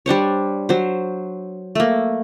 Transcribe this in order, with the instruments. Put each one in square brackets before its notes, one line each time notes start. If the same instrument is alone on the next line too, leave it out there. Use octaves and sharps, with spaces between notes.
[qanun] G3 D4 C5 C#5
F#3 C5
A3 A#3